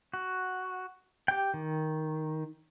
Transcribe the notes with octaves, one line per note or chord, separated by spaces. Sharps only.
F#4
G4 G5
D#3